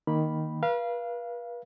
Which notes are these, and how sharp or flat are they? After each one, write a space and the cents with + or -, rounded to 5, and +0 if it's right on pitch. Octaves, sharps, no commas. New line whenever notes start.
D#3 +0 A#3 +5 B5 -5
B4 -40 F5 -20